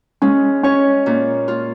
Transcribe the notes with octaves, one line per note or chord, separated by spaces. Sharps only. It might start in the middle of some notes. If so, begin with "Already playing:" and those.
G#3 C#4
C#4 C#5
A#2
F4